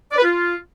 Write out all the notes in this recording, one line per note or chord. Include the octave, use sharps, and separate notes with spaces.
D5
B4
F4